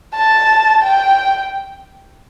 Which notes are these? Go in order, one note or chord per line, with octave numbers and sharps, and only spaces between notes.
A5
G5